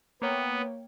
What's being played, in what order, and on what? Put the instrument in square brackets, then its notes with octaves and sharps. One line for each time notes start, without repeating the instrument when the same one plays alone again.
[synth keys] A#3 C#5 G5 [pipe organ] B3